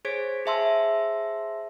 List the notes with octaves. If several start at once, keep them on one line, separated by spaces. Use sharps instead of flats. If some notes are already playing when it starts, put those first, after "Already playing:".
G#4 C5 C#5 G#6 B6 D7
G#4 C5 E5 A5 C6 E6